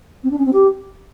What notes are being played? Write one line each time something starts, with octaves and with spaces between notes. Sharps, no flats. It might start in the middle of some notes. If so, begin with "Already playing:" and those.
C4
D4
C#4
C4
G4